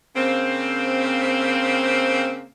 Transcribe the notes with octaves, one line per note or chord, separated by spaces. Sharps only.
C#3 A#3 C4